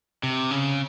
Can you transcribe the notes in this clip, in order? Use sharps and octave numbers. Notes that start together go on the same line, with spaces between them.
C3
C#3